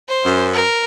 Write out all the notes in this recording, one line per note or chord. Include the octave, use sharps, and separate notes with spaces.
C5
F#2
A#4